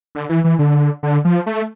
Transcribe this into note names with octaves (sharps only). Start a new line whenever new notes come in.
D3
E3
E3
D3
D3
F3
A3